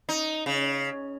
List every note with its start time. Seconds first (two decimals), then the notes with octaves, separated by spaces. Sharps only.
0.09 D#4
0.46 C#3